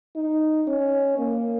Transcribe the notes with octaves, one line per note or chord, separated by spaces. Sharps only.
D#4
C#4
A#3